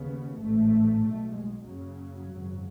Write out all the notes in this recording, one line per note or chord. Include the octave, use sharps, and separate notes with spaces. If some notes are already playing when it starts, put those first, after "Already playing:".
Already playing: D#2 C#3 B3
A1 G#2 A3
B1 B2
G#3
F#1 F#2 C#3 F#3
G#1 F#2 C#3